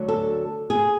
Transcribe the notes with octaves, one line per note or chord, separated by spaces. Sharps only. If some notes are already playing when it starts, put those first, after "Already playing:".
Already playing: D2 D3 F#3
A4
G#4